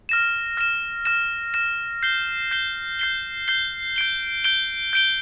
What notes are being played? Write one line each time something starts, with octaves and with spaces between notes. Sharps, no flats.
F6 A#6 E7
F6 A#6 E7
F6 A#6 E7
F6 A#6 E7
G6 C7 G7
G6 C7 G7
G6 C7 G7
G6 C7 G7
G6 D7 G7
G6 D7 G7
G6 D7 G7